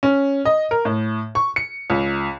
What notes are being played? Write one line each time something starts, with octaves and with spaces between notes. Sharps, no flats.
C#4
D#5
A#4
A2
C#6
C#7
C#2